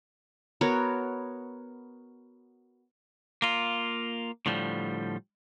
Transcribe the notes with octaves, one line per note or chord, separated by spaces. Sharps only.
B3 F#4 A#4 C#5
A#3 F4
A2 D3 F3 G3